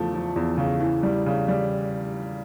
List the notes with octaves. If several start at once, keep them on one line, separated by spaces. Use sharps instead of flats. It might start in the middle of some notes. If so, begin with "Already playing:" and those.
Already playing: E2 C#3 F3 A3
F3
E2
C#3
E3
G3
C#3
G3